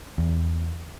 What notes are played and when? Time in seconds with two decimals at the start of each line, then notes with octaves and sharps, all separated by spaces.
0.18 E2